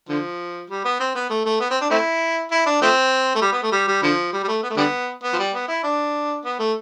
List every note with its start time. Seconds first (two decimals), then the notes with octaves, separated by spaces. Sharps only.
0.09 D3 F3
0.70 G3
0.85 B3
1.00 C4
1.15 B3
1.30 A3
1.45 A3
1.60 B3
1.70 C4
1.81 D4
1.90 A3 C4 E4
2.51 E4
2.66 D4
2.82 F3 A3 C4
3.35 A3
3.41 G3
3.52 B3
3.62 A3
3.72 G3
3.87 G3
4.03 D3 F3
4.33 G3
4.43 G3
4.48 A3
4.63 B3
4.70 A3
4.77 D3 G3 B3
5.23 B3
5.33 F3
5.39 G3
5.53 B3
5.68 E4
5.84 D4
6.45 B3
6.59 A3